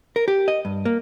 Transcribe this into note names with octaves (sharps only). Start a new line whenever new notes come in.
A#4
G4
D#5
G2
A#3